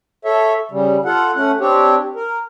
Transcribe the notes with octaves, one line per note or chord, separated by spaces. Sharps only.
A4 C#5 E5
C#3 G3
F4 A4 F#5
A3 C#4 F#5
C4 D4 G4 C#5
A#4